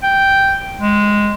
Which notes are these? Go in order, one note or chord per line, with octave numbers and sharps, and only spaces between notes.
G5
G#3